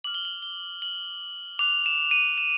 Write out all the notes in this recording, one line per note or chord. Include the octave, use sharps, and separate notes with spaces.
D6 F6 F#7
G7
F#7
G7
F#7
D6 F#6 F7
E7
D#7
E7